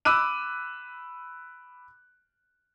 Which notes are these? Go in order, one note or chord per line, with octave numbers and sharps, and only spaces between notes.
B5 D6 E6 F#6 D#7